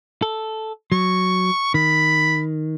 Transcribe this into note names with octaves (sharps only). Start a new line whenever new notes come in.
A4
F#3 C#6
D#3 B5